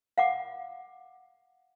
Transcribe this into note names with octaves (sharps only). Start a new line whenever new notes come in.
F5 F#5 D6